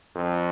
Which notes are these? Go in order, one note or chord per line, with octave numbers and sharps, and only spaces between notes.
F2